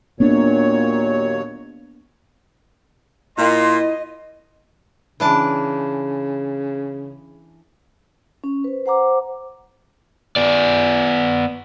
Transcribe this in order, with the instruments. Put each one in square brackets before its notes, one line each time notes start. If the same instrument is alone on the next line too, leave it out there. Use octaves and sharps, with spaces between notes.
[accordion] D#2 F#3 C#5 [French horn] A#2 [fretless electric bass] A#3 B3 D4
[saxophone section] A#2 [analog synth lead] E4 [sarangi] D#5 [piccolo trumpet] C6
[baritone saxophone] C#3 [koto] E3 D4 A5
[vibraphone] C#4
B4 C5
C5 F#5 A#5 D6
[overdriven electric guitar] B3 D5